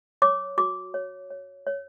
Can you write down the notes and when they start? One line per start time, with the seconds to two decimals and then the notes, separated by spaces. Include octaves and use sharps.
0.22 C#5 D6
0.58 F#4 D6
0.94 C#5
1.30 C#5
1.67 C#5